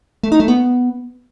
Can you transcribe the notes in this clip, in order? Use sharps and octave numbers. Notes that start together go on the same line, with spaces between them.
A3
D#4
A3
B3